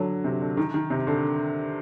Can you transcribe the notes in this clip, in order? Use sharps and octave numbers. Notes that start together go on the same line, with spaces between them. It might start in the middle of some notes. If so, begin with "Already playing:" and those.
Already playing: D3 F#3
C3
D3
D#3
D#3
C3
D3